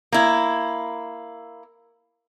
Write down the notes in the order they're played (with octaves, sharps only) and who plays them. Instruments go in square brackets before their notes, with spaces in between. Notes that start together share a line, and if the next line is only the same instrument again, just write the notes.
[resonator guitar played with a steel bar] A#3 E4